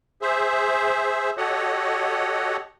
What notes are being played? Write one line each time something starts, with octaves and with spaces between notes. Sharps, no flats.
G#4 C5 E5
F#4 G4 A4 C#5 D#5 F#5